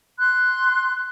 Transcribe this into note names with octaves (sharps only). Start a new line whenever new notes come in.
C6 F#6